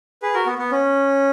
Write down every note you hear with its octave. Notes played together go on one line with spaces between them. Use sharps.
G#4 B4
F#4 A#4
B3
B3
C#4